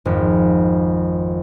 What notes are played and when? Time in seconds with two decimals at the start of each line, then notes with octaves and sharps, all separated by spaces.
0.05 G#1 F2